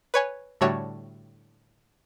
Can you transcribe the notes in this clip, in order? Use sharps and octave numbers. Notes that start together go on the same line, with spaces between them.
B4 C#5 G#5
A2 D3 G3 A3 F#4 C#5